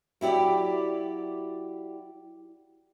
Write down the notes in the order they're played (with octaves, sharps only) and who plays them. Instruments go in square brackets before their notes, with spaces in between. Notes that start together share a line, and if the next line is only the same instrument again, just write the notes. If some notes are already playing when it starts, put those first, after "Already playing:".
[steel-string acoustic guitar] F#3 E4 G4 D5